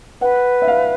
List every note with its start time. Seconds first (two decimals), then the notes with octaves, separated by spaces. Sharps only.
0.21 B4 F#5
0.62 E5
0.68 F5